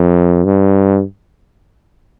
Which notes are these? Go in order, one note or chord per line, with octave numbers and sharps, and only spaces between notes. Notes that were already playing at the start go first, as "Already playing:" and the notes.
Already playing: F2
G2